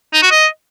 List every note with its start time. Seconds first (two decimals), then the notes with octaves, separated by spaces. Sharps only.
0.13 D#4
0.22 F#4
0.31 D#5